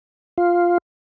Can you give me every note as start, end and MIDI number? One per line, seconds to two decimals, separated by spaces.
0.38 0.78 65